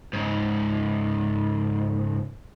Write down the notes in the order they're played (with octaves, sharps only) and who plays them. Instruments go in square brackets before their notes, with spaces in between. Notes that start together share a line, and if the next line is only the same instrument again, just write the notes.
[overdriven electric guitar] C#2 G#2